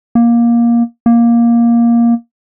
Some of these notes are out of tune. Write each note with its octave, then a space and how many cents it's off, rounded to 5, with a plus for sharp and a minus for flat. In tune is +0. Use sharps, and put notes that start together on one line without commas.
A#3 +15
A#3 +10